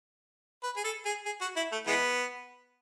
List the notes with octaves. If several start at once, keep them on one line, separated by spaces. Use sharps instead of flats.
B4
G#4
A4
G#4
G#4
F#4
E4
A3
E3 G#3 B3